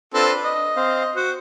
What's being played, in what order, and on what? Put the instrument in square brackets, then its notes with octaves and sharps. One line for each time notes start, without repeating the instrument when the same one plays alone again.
[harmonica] C4 F4 A4 [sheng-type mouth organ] D4 B4
[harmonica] D#5
[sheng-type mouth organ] C4 C5 F5
[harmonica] F#4 [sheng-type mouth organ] C5